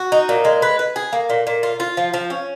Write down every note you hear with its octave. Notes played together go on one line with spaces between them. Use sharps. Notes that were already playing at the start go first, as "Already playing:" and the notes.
Already playing: F#4
D#4
A#2
G#3
B4
B4
G#4
A#3
A#2
A#2
F4
F4
F3
F3
C#4